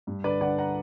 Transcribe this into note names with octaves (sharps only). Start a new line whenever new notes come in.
G2
D3 B4 D5
D3 D5 F#5
F#5 A#5